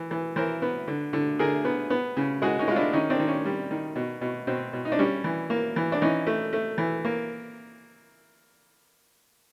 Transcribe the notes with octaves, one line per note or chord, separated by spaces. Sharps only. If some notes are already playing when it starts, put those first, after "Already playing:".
Already playing: E3
E3
E3 A#4 C5
B3
D3
D3
D3 G#4 A#4
B3
B3
C#3
G#3 F#4 G#4
C#4 D#4
G#3 F4
D4 E4
D#3 C#4 D#4
C4 D4
D#3
C#4
G3
D#3
B2
B2
B2 C4
B2
D#4
D4
G3 C#4
E3
A#3
E3
D4
E3 C#4 D#4
A3
A3
E3
A#3